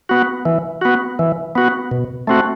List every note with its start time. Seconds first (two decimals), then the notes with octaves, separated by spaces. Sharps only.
0.09 B3 F#4
0.45 E3
0.81 B3 F#4
1.19 E3
1.55 B3 F#4
1.91 B2
2.27 A3 C4 F#4